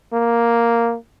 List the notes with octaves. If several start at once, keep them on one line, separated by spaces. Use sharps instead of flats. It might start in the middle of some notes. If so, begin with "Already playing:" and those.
A#3